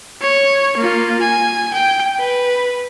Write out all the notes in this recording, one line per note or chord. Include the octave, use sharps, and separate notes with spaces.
C#5
A#3 F4
G#5
G5
B4